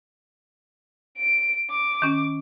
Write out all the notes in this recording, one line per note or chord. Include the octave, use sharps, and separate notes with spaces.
D7
D6
D#3 C#4